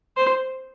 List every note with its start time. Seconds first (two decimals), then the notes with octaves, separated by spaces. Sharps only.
0.16 C5